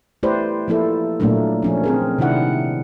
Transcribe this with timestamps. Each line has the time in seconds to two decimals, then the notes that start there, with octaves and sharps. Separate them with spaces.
0.23 A3 E4 G4 B4 C5 D5
0.68 F3 A#3 E4 A4
1.20 A#2 F#3 A3 A#3 D4
1.63 F3 C#4 D4
1.84 C4 G#4 A#4
2.18 C3 D#3 D4 E4 F#5